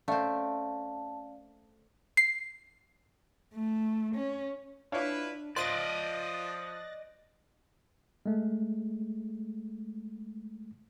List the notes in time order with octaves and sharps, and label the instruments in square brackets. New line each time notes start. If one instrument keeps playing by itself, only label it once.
[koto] A3 C4 [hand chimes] C#4 D5 F5 [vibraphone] A5
[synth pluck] C7
[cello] A3
C#4
[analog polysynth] D4 [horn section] E4 F4 B4 [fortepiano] C#5 F5
[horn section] F3 [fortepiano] C5 [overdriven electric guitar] D5 D#5 [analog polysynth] F#6 A6 A#6
[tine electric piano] G#3 A3